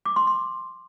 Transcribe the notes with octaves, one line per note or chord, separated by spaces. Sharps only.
D6
C6
C6